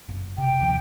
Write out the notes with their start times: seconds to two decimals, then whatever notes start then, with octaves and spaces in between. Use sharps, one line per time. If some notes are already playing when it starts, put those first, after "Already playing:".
0.09 F#1
0.38 C3 G5
0.60 D#2 F3